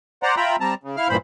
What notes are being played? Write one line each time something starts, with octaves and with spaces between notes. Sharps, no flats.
C5 D5 F#5 A#5
F4 E5 G5 A#5 B5
G3 C4 A5 A#5
C#3
E4 F5 F6
G2 A#2 E3 C5 B5